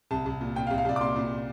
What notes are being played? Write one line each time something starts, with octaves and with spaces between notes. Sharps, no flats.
C2 A5
C2
A#2
A#2 G5
F5
C2
F5
C2 D5
D6
A#2 C6
A#2